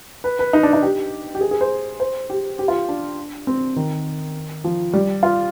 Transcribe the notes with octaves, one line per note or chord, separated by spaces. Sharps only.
B4
B4
D#4
D4
D#4
G4
G4
G#4
G#4
C5
C5
G4
G4
F4
D4
C4
D#3
F3
G3
F4